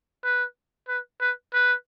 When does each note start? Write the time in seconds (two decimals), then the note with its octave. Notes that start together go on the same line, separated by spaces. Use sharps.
0.24 B4
0.88 B4
1.21 B4
1.53 B4